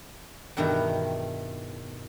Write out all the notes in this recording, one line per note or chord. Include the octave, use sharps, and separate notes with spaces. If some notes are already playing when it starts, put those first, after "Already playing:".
E2 G2 B2 D#3 E4 A#5